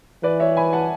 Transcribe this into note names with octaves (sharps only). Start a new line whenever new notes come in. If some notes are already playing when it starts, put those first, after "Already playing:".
E3 B4 D5
C#5 E5
G#5 B5
F#5 A5